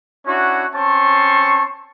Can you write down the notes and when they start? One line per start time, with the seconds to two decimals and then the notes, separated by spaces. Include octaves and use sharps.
0.26 C#4 D4 E4 F#4
0.75 C4 C#4 A5 C6 C#6